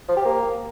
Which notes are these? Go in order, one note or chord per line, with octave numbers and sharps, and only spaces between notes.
F3
G4
A#3